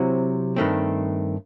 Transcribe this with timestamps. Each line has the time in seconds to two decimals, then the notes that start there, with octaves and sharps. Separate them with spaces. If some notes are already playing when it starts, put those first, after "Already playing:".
Already playing: C3 F#3 C4 E4 F#5
0.56 G2 D#3 A3 C4